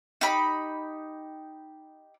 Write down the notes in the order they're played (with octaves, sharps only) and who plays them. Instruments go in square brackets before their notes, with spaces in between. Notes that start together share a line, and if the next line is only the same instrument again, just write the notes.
[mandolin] D#4 G4 B5